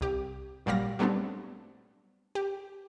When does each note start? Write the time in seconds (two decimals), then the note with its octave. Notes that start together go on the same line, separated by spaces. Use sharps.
0.01 C2 G4
0.66 G#1 A#2 F#3 G3 F5 A#6
0.99 F#3 G3 A3 B3 C4 D4
2.35 G4